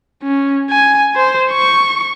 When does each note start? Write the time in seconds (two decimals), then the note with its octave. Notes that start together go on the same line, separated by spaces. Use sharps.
0.23 C#4
0.70 G#5
1.16 C5
1.51 C#6